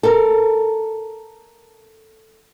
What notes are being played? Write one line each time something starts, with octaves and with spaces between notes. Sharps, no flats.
A4 A#4